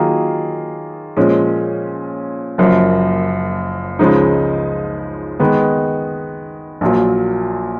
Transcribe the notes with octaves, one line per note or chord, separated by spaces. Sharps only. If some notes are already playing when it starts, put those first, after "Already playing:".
Already playing: D#3 F#3 A#3 F4 G#4
A#2 F3 G#3 C#4
F#1 F#2 F3
C#2 C#3 F3 G#3 D#4
D#3 G#3 B3
A#1 A#2 F#3